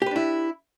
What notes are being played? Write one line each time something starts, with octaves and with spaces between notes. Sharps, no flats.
D4 E4 G4 B4